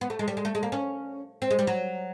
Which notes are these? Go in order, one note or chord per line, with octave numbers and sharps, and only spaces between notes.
B3
A3
G#3
G3
G#3
A3
G#3
A#3
C#4
C4
G#3
G3
F#3